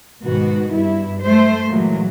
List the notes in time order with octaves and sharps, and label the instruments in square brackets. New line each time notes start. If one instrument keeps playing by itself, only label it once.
[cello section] G#2 B2 D#3 B3 F#4
G2 E4
A3 C5
A#2 E3 F#3 G#3